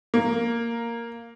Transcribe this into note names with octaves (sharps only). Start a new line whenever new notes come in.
A#3